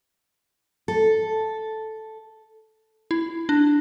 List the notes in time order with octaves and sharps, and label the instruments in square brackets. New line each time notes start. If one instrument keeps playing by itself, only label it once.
[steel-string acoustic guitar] A4
[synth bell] E4
D4